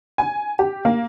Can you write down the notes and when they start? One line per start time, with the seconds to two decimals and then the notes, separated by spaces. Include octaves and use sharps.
0.18 G#5
0.59 G4
0.85 A#3